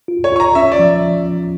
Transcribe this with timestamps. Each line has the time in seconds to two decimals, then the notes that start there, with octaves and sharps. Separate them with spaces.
0.08 F4
0.24 C#5
0.32 F4 C#6
0.40 A#5
0.55 C#4 E5
0.72 D5
0.79 F3